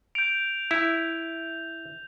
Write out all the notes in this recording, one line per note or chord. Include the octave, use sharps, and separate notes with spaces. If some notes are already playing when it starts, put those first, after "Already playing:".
G6 D7 F7
E4